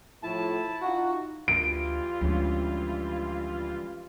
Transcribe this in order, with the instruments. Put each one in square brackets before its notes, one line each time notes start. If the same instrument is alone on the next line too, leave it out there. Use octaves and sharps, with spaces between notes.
[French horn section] A2 F3 [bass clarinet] E4 [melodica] A5
[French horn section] D#4 F4 [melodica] F#4
[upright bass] D2 [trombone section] E3 G3 F4 [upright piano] D7
[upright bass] D2 [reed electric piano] F3 G#3 C#4